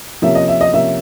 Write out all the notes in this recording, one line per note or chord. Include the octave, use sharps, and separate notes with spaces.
C3 F3 A#3 C#4 E5
D#5
E5
D#5
C3 F3 A#3 C#4 E5